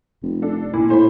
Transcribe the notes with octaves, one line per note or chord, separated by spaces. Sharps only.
F1
D4 A4
A#2 E4
A2 C5 B5